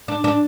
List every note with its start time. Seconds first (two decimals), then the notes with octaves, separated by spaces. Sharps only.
0.08 D4
0.24 D4